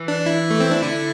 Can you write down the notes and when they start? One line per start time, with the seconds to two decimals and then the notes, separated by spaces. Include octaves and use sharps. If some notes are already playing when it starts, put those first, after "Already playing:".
Already playing: E3
0.08 D4
0.26 E4
0.51 A3
0.60 C4
0.71 D4
0.82 D3 E4